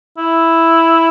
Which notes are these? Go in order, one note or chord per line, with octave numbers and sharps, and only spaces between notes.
E4